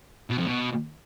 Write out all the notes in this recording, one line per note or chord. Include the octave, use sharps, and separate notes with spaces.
B2
F2
B2